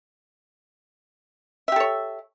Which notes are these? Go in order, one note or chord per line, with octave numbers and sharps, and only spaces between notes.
G4 A4 C#5 E5